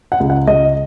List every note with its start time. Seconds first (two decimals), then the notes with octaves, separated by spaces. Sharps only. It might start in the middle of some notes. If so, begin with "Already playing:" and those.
0.12 F#5
0.20 C#2
0.30 F#5
0.47 C#2 D#5